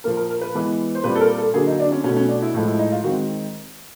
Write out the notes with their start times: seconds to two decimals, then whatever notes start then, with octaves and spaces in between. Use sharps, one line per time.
0.04 A#2 F3 A#3 A#4
0.17 A#4
0.30 A#4
0.41 B4
0.55 E3 G#3 B3
0.95 C5
1.04 A#2 G3 C4 B4
1.15 A4
1.20 A#4
1.38 A4
1.54 D3 F#3 A#3 G#4
1.67 D#4
1.80 D4
1.92 C#4
2.04 B2 F#3 A3 C#4
2.16 C#4
2.29 D4
2.42 E4
2.54 A2 F3 G#3
2.67 E4
2.79 D#4
2.92 F4
3.04 D#3 G#3 C4 F#4